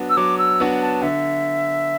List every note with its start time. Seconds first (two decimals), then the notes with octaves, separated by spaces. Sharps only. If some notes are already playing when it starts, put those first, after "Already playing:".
Already playing: F#3 B3 D4 F#4
0.10 E6
0.17 F#3 D6
0.38 E6
0.60 B3 D4 F#4
0.81 A5
1.02 D3 E5